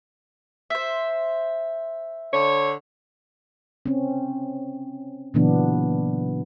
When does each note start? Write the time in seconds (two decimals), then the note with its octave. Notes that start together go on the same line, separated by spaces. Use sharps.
0.70 C5 E5
2.33 D3 C#5
3.86 C4 C#4
5.34 A#2 C#3 E3 F#3 B3 D4